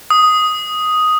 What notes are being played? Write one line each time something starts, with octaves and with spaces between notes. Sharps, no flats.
D#6